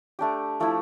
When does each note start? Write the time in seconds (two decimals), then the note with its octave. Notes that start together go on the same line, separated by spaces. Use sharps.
0.19 A3 D4 G4
0.60 F3 A3 E4